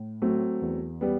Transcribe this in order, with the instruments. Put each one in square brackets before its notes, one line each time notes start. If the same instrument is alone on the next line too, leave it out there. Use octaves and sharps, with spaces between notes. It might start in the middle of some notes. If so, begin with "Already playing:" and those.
Already playing: [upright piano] A2
[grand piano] F#3 A3 [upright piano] C4
[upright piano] E2
[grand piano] G3 B3